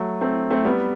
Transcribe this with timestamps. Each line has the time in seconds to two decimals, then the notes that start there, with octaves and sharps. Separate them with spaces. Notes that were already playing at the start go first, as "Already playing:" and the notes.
Already playing: F#3 A3
0.21 A3 C4
0.50 A3 C4
0.65 G3 B3